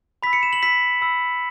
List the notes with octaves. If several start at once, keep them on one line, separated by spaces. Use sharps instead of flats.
B5 E6 B6
C#7
E7
F#7
B5 E6 B6
B5 E6